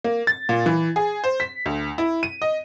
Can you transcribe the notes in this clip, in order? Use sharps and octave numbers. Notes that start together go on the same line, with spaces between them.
A#3
A6
A#2
E3
G#4
C5
B6
D2
E4
D#7
D#5